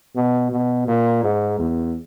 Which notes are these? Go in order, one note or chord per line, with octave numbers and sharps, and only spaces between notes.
B2
B2
A#2
G#2
E2